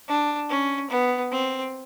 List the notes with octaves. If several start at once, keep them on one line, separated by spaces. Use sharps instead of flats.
D4
C#4
B3
C4